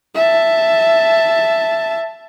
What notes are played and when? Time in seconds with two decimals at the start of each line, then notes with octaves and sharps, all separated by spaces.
0.15 E5 A5